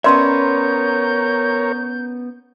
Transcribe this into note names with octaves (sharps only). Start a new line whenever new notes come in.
B3 C#4 A#4 C#5 D5 E5 C6 G6